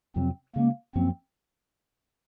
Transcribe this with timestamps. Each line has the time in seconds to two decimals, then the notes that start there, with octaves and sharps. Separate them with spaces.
0.16 F2 C3 F#3 C4
0.55 C#3 G#3 A#3 C#4
0.95 F#2 F3 A#3 C4 C#4